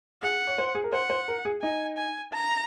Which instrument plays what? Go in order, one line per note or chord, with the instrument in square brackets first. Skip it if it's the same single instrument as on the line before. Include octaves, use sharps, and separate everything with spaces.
[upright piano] G#4 [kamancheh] F#5
[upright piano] C#5
C5
G#4
A#4
[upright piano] C5 [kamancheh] F#5
[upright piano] C5
A#4
G#4
[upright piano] D#4 [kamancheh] G#5
[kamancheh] G#5
A#5